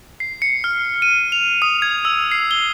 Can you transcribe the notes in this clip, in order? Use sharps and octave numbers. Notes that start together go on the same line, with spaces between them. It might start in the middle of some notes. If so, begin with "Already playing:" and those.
C7
C#7
F6
D#7
F7
D#6
G#6
E6
C7
G7